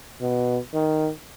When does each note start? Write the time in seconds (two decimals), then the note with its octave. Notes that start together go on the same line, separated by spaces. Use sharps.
0.21 B2
0.74 D#3